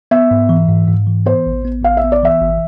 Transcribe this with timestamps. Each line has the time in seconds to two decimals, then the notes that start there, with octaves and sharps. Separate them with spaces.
0.11 B3 E5
0.31 G#2
0.49 E3
0.68 G#2
0.88 G#2
1.07 E3
1.26 B3 C5
1.46 A1
1.65 B3
1.83 A1 F5
1.97 E5
2.04 B3
2.12 D5
2.23 E3 E5
2.41 G#1